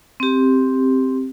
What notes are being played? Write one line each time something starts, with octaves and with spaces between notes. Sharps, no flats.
C4 G4